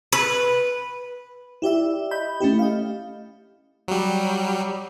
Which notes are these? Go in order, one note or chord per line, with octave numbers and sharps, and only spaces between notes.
B4
E4 G4 D5 E5
D#5 B5 G6
A3 C#4 E4 G4
D#5 F5
F#3 G3